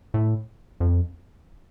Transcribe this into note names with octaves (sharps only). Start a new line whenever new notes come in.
A2
F2